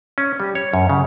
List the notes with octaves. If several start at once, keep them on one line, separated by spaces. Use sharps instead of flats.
C#4
G3
C#5
F#2
C#3